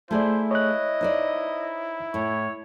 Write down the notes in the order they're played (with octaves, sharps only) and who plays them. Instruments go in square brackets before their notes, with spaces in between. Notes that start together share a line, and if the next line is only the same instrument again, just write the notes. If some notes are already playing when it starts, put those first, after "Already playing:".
[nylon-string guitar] A3 G#4 D5 [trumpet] E4 [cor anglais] C5
[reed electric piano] C#5 F#6 [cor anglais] D#5
[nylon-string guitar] D#4 C5 D5
[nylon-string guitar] A2 [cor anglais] C#5